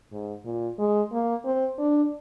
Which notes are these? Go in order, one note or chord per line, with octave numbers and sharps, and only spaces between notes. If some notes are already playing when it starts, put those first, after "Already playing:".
G#2
A#2
G#3
A#3
C4
D4